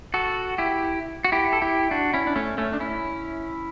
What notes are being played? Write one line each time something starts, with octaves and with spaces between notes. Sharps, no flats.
F#4 A4
E4 G4
F#4
E4 G4
A4
E4 G4
D4 F#4
C#4 E4
D4
A3 C#4
A3 C#4
D4
C#4 E4